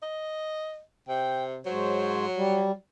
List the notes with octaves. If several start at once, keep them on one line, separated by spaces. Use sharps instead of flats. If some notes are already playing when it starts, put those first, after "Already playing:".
D#5
C3 G5
G#2 F#3 C5 C#5
G3